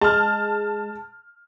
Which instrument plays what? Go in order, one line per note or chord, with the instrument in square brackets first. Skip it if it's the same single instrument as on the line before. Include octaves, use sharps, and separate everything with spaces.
[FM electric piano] G#3 [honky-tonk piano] A5 F6